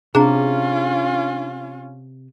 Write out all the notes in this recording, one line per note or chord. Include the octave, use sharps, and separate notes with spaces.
C3 C#4 D4 F4 G#4 A#5